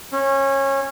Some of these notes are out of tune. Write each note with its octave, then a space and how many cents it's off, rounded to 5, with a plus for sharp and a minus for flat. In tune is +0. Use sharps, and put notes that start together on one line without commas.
C#4 -25